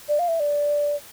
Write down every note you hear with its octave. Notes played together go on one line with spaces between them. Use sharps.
D5
F5
E5
D5